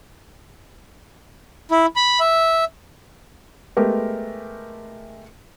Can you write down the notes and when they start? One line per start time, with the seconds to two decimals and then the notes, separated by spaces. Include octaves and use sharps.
1.71 E4
1.96 B5
2.20 E5
3.77 G#3 A3 B3 G4 A#4